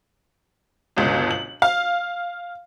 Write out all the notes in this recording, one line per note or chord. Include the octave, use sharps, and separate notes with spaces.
G1 C#2 B2
F#7
F5